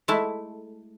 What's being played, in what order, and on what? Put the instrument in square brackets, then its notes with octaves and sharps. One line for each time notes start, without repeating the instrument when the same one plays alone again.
[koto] G#3 A3 E4